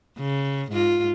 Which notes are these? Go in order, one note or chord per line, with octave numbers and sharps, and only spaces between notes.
C#3
G#2 F4